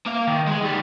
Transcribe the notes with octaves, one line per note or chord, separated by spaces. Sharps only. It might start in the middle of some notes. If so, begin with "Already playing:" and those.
A#3 F5
D#3
G#3 G#4
D#3 G3